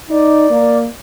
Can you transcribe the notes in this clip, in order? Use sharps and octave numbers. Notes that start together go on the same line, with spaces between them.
D#4 D5
A#3